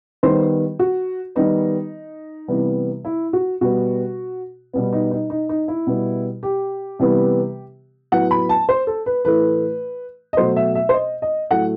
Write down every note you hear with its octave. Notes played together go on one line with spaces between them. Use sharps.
D#3 G3 B3 C5
F#4
D#3 G3 B3 D#4
C3 E3 G3 B3
E4
F#4
B2 G3 B3 F#4
B2 G3 B3
D#4
D#4
D#4
D#4
E4
B2 G3 B3
G4
C3 E3 G3 B3
A2 F#3 B3 F#5
B5
A5
C5
A4
B4
A2 E3 A3 B4
D#5
B2 F#3 A3 C5
E5
E5
C5
D#5
D#5
A2 F#3 A3 F#5